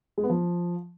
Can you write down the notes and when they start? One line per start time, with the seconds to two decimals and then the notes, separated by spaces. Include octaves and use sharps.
0.18 G#3
0.24 B3
0.30 F3